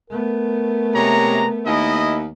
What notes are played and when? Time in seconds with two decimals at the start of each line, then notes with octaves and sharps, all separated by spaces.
0.10 A3 B3 A#4
0.95 C3 G#3 C#5 A#5
1.66 D#2 E4 D#5